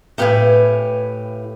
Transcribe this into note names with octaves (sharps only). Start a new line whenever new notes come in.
A2 G4 B4 E5 F5 G#5